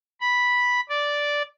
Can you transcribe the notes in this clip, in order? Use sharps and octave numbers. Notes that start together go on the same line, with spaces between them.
B5
D5